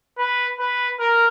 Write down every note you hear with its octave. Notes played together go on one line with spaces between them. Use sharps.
B4
B4
A#4